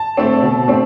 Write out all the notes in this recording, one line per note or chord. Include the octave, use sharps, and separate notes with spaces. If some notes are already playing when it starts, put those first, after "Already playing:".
Already playing: A5
A3 C4
B2
A3 C4